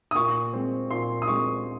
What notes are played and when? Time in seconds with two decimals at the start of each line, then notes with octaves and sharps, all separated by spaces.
0.11 D#6
0.15 A#2 C#6
0.53 G#3 C4
0.91 A#2 C6
1.22 D#6
1.28 G#3 C4 C#6